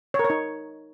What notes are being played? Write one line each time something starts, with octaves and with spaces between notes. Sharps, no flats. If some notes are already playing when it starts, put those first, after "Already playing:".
C#5
A#4
C#5
D#4